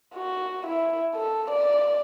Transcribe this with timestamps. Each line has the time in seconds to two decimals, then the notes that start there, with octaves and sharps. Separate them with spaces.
0.15 F#4
0.67 E4
1.16 A4
1.50 D5